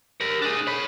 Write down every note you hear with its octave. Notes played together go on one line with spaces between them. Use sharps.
G4 A#4
D4 G#4
C#5 B5